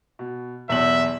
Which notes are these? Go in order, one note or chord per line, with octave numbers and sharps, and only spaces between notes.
B2
B1 E2 E5 F#7